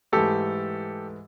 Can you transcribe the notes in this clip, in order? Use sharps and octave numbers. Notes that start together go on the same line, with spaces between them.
G#2 E3 A3 G4 A4